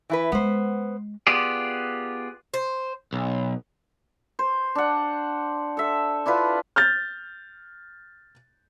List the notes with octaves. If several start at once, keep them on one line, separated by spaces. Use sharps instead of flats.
E3 E4 B4
G#3 B3 C5
B3 F4 G4 G#4 D5
C5
B1
C5
D4 F#5
A4 E5
D4 E4 F4 B4
F6 G6 A6